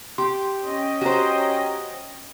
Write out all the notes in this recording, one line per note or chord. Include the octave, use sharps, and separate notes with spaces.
G4 C6
C#4 D#5 G5
F#4 G4 C5 A#5